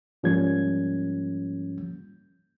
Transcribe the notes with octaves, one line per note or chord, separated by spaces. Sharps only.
G#2 F3 G3 A#3 C#4 G#6